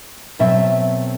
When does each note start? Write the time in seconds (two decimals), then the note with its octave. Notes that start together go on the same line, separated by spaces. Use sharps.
0.39 B2 F#3 A3 C4 E5